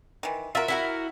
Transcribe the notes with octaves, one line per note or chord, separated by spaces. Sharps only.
D#3 E3
F4 F#4 A#4 E5
E4 F#4 A#4 E5